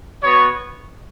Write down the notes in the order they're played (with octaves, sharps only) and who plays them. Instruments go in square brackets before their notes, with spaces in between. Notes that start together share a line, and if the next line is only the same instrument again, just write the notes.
[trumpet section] B3 F#4 C#5